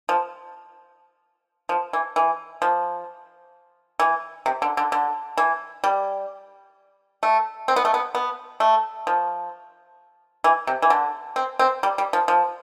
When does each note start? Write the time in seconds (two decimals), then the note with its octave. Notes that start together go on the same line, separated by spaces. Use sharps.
0.09 F3
1.69 F3
1.93 E3
2.16 E3
2.62 F3
4.00 E3
4.46 C3
4.62 D3
4.77 D3
4.92 D3
5.37 E3
5.84 G3
7.23 A3
7.68 C4
7.76 B3
7.85 A3
7.94 B3
8.15 B3
8.60 A3
9.07 F3
10.44 E3
10.67 C3
10.82 E3
10.90 D3
11.36 C4
11.59 C4
11.83 G3
11.98 G3
12.13 F3
12.28 F3